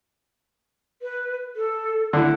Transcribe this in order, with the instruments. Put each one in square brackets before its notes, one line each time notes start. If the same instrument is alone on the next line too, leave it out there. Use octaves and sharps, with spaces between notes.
[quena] B4
A4
[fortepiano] D3 E4 [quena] A4